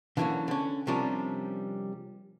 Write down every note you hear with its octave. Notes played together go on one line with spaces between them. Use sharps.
D3 E3 F#3 A3 A#3 C#4
D3 C#4
C3 F3 G3 C#4 D4 A#4